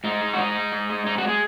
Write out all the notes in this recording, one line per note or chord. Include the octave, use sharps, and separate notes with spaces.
G#2 D#4
G#3
F#4
G#2 D#4
G#3
G#2
G#3
G#2 D#4
F#4
G#3
G#4